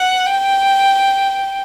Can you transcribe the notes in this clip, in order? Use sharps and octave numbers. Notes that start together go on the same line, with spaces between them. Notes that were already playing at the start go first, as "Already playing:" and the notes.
Already playing: F#5
G5